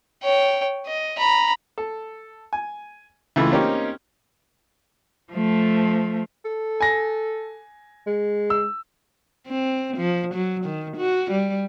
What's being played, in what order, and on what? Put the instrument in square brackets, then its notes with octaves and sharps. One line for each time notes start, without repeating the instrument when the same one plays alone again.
[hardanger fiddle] C#5 G5
D#5
A#5 B5
[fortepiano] A4
G#5
C#2 E3 A3 F4 B5
A#3 C4 C#4 D#4 G4
[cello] F3 A3
[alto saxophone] A4
[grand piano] G#5 A#6
[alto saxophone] G#3
[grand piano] E6
[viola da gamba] C4
F3
F#3
D#3
F#4
G3